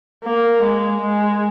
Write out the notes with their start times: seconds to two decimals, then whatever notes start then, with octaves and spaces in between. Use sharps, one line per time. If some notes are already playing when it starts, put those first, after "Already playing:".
0.24 A#3
0.63 G#3
1.01 G#3